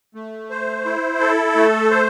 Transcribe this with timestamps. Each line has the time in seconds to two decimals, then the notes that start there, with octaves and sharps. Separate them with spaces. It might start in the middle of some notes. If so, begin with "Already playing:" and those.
0.15 A3
0.50 C5
0.85 E4
1.20 A4
1.56 A3
1.91 C5